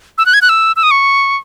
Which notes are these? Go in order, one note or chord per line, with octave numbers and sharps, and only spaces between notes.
E6
F#6
G#6
F#6
E6
E6
D#6
C#6